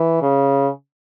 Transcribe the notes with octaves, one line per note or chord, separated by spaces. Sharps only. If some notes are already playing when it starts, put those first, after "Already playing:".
Already playing: E3
C#3